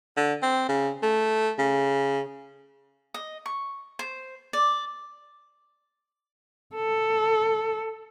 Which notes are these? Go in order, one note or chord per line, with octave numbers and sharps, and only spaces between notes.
D3
C4
C#3
A3
C#3
D#5
C#6
C5
D5
A4